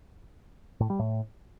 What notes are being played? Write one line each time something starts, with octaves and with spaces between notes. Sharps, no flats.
A2
G3
A2